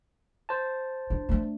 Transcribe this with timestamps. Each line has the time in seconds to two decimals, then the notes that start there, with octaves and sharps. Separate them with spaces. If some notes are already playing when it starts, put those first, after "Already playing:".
0.49 C5 A5
1.10 D4
1.29 A3 D4